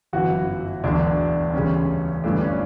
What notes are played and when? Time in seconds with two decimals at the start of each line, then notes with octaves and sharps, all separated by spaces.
0.13 G1 F#2 E3 F#4
0.84 E1 D2 D3 F#3 D4
1.54 E1 D2 C#3 G3 C#4
2.24 G1 G2 E3 A3 D4
2.41 C#4